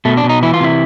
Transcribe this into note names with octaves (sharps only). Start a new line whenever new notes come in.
B2 A3
D4
B2
D#4
E3 E4
F4
C3 E4